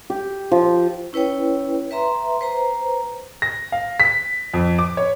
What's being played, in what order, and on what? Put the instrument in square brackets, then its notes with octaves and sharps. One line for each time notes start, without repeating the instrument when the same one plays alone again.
[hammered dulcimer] G4
F3
[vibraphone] C#4 E4 B4 C#5 G5
B4 E5 A#5 C6
B4 C5 A#5
[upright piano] A#6
F5
B6
F2
D6
C#5